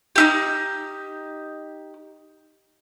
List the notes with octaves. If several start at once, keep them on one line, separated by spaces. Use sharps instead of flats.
D#4 E4 G4